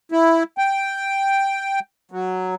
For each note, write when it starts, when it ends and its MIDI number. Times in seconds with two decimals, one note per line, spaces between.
0.12 0.43 64
0.58 1.80 79
2.11 2.55 54